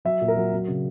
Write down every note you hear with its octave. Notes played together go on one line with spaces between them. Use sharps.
F#3 E5
A#2
A#4
F#3
F#3
C#3